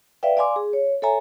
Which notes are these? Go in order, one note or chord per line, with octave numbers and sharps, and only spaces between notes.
B4 D5 E5 F5 G5
D5 F5 G#5 C6 D6
G#4
C#5
A4 C#5 E5 G#5 A#5